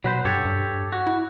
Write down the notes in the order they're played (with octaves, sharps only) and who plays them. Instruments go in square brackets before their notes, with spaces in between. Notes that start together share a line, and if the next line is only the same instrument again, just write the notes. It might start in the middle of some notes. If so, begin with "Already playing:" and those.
[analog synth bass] B2 [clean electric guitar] F#3 B4 C5
[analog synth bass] G2 [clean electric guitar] G4 A4 C#5
[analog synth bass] G2
[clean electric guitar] F#4
[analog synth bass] E4